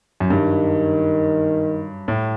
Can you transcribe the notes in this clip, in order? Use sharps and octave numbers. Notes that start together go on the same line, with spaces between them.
F#2
G2 D#3
A2